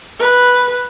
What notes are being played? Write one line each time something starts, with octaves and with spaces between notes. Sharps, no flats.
B4